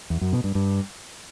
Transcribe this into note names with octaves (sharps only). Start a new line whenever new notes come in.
E2
F#2
B2
G2
G2